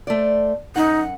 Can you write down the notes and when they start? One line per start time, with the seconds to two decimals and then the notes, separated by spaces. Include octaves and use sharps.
0.07 A3 C5 D5
0.76 F#2 D#4 F#5